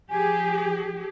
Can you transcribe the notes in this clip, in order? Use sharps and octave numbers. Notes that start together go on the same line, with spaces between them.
F3 G4 G#4 G#5